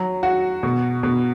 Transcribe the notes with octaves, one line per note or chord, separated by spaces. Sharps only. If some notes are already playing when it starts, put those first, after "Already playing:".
Already playing: F#3
F#4
B2
B2